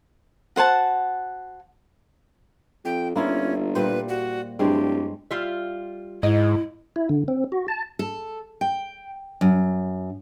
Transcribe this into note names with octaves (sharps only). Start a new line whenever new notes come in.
F#4 C5 F#5 A5
F2 G5
G1 A#3 C#4 E4 F4
A#2 G3 B4 C5
F#4
D1 G2 G#3 C4 G4
G3 F4 E5
G#2 E4 D#5
E4
D3
C4
F#4
A5
A4
G5
F#2